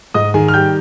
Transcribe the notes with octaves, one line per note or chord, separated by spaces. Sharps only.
G#2 D#5 D#6
D#3 G#4 G#5
F6
G3 G5 G6